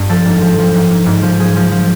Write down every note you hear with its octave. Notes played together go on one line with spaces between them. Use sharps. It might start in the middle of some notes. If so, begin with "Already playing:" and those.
Already playing: G2
F3 A4
G#2
F3
F3
G#2
G#2
G#2
F3
F3 G#4
F3
F3